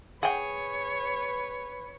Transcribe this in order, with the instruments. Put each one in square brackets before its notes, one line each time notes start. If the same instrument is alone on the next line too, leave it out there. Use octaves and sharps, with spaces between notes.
[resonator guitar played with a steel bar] G#4 [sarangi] B4 [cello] C#5 [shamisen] F#5 G5